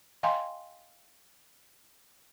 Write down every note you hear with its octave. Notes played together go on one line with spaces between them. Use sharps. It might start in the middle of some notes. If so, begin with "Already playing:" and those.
D#5 F5 G5 G#5 A#5 C6